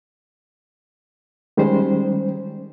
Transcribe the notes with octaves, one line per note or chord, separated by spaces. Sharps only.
D#3 G3 G#3 C#4 C5